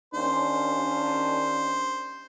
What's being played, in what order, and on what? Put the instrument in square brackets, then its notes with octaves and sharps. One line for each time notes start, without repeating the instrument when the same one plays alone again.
[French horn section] D#2 C#4 D4 [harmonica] C5